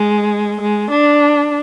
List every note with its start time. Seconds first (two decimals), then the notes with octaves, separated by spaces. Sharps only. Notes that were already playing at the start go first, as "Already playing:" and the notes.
Already playing: G#3
0.61 G#3
0.91 D4